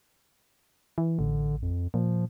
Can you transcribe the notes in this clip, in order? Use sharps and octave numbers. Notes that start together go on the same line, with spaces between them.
E3
A1 D3
F2
A#2 F3